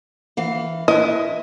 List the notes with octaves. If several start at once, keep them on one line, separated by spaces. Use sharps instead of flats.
E3 F5
E4 B4 D#5